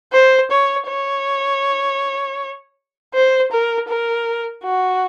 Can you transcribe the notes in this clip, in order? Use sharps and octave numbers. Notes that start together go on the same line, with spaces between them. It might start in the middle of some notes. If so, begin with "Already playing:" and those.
C5
C#5
C#5
C5
A#4
A#4
F#4